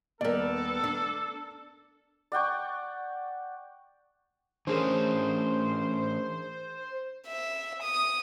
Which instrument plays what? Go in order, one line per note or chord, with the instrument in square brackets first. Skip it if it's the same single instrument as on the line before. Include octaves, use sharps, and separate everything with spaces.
[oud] D#2 G3 [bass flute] B3 [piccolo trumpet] A4 [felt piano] A#4 D5
[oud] D4
[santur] D5 F#5 G5 C#6
[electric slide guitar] E3 A3 C#4 [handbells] D4 G#4 A#4 [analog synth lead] C5
[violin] E5
D#6